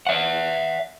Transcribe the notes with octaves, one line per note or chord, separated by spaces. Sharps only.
E5 F#5